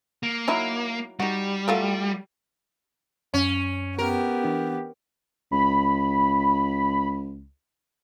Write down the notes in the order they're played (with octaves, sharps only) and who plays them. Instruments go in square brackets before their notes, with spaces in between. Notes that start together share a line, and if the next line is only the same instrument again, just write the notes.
[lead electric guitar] A#3
[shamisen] F#3 D#4 E4
[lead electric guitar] G3 [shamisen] D#4 F#4
[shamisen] F#3 A3 F4
[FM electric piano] F#2 [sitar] C#4
[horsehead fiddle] B3 G4 [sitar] A#4
[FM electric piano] E3 D4
[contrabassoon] C#2 [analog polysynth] B5